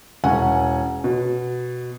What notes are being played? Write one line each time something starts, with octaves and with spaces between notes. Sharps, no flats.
E1 C#4 F#5 G#5
B2